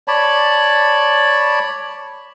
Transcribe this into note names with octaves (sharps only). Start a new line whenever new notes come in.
C#5 D5 A5 B5